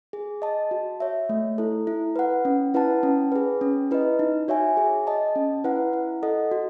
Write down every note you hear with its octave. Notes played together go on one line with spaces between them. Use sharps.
G#4
D#5 A5
F#4
C#5 E5
A3
E4 A4
E4
B4 F#5
C#4
E4 B4 F#5 A5
C#4
G#4 B4
C#4
E4 B4 D#5
D#4
F#4 C#5 E5 G#5
G#4
D#5 A5
C#4
E4 B4 F#5
E4
A4 D#5 F#5
F#4